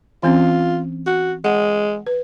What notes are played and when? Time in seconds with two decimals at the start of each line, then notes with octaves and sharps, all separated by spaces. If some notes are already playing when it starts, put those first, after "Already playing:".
0.23 E3 C4 C#4 F4
1.07 F#4
1.44 G#3 F#5
2.06 B4